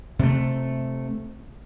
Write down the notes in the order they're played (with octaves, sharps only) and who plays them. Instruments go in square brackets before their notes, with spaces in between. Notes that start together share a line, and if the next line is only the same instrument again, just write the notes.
[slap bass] C3 A3